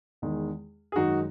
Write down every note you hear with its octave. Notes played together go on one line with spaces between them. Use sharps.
E2 D#3 G#3
G#4
F#2 D#3 G#3 D#4 F#4